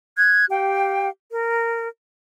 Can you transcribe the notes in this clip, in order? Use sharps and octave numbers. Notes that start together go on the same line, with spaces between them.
F#6 G#6
G4 F5 G5
A#4